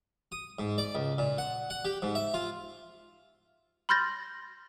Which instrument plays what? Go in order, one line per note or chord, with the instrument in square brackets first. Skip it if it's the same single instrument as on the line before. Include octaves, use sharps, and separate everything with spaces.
[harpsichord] D#6
G#2
D5
C#2
A#2
F#5
F#5
G4
G#2
E5
F4
[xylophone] B5 C6 F6 G6 A6 A#6